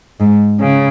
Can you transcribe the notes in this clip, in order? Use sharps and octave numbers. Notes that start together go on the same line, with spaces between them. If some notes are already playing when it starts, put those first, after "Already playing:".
G#2
C#3